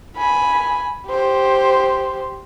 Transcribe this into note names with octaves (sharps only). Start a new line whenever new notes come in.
G#5 B5
G4 C5